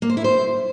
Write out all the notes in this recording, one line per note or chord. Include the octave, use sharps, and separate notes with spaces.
A#3
C5
E4
C5